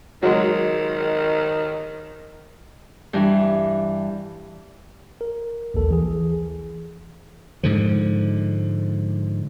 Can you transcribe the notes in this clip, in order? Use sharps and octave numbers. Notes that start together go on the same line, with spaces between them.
D#3 F#3 G#3
G2 E3 D4
A#4
A#1 D#2 A4
E3 G#4
G#2 D3 F3